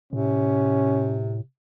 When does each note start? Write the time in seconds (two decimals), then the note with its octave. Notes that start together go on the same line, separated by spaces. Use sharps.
0.13 A2 C3 C#4